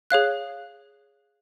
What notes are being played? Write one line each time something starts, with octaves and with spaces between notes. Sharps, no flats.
G#4 C#5 F5 F#6